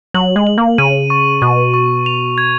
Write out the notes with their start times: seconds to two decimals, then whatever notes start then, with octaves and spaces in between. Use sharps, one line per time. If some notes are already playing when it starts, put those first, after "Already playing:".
0.14 F#3 F#7
0.36 G#3
0.47 F#7
0.58 A#3
0.78 C#3 D#7
1.10 C#6
1.42 B2 C#6
1.74 C#6
2.06 F7
2.38 G#6